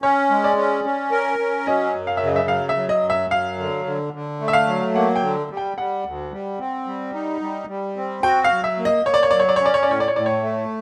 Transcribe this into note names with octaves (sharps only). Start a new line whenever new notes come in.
C#4 C#5
G#3
D5
C#4
C#4
A#4
C#4
F#3 D#5
F#2
F5
E5
C#3
D#5
E5
F#3 F5
E5
F#3
D#5
F#2
E5
F#3 F5
D3
D3
D3
A3
E5
F5
F#3
A#3 F#5
G5
D3
G3
G5
G3 F#5
D2
G3
C4
G3
D#4
G3
G3
C4
F#4 G5
F5
F#3
E5
A#3
D#5
A#3 C#5
D5
C#5
F#3 D5
C#5
D5
C#5
C#4 D5
C#5
D5
A2 C#5
D5
C#5
A2 D5
C#5
A3